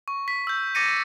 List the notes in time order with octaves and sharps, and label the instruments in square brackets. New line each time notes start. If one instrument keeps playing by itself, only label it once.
[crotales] C#6
B6
E6 G6
D6 A6 A#6 C#7 D#7